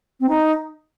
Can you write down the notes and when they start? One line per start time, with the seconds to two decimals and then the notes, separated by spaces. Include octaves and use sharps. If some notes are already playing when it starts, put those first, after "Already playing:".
0.20 C4
0.29 D#4